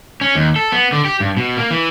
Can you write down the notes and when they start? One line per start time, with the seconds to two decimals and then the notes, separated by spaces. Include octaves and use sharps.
0.21 C#4
0.35 D#2
0.56 A4
0.72 B3
0.92 D3
1.05 G4
1.20 G2
1.37 B2
1.57 A#3
1.71 E3